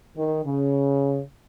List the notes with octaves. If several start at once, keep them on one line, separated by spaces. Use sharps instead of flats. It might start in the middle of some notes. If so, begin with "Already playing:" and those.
D#3
C#3